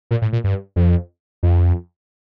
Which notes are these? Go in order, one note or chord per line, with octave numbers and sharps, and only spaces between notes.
A#2
A2
A#2
G2
F2
F2